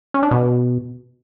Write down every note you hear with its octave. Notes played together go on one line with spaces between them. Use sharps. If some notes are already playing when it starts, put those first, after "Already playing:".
C#4
D4
B2